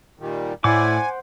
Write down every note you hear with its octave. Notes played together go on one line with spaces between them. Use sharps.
A#2 D#3 G3
A2 E4 C5 D5 F#5 G#5 D6